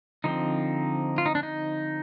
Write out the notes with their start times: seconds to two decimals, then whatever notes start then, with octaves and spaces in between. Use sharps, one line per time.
0.24 D3 F3 C4 D#4
1.18 F4
1.26 D#4
1.35 D4
1.43 D#4